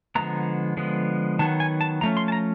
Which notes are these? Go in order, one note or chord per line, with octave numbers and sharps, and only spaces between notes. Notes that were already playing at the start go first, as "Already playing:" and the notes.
D3 F3 G#3 B3 A#5
D3 F3 G#3 B3
D#3 F#3 B3 A5
G#5
A5
F3 A3 C#4 A#5
C6
A5
A#5